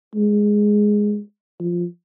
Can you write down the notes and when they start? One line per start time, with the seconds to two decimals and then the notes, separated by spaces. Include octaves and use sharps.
0.15 G#3
1.60 F3